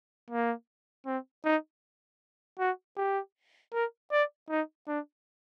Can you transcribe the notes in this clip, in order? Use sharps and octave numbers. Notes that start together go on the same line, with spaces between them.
A#3
C4
D#4
F#4
G4
A#4
D5
D#4
D4